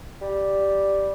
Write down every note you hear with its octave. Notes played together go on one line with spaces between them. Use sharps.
G3